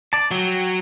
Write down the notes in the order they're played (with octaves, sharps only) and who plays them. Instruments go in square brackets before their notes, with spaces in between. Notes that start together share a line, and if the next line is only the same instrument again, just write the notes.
[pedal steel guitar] D5 A5
[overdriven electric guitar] F#3 [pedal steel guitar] G5